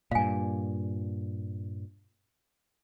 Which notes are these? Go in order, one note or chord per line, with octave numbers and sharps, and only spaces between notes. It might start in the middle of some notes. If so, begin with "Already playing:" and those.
G2 A#2 F5 G#5